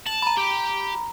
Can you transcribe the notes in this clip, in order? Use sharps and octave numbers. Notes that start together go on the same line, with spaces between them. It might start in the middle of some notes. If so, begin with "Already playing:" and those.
A5 F#7
A#5 B5
G4